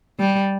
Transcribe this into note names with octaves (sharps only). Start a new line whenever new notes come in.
G3